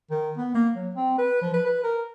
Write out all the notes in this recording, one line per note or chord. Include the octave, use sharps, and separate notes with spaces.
D#3
B3
A#3
F#3
C4
B4
F3
B4
B4
A#4